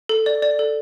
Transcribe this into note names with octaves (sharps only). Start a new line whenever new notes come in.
A4
D5
D5
A4